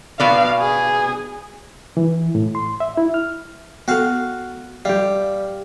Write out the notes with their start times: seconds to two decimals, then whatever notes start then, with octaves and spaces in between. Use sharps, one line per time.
0.20 B2 B3 D5 F5
0.60 G#4
1.97 E3
2.35 A2
2.55 C6
2.80 E5
2.97 E4
3.14 F6
3.88 B3 F#4 A4 F5
4.85 G3 G4 F5